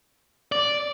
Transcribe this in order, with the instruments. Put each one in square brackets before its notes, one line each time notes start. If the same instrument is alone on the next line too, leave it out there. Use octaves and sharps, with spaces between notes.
[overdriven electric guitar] D5